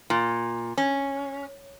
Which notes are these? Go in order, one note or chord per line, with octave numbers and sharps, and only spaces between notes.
A#2
C#4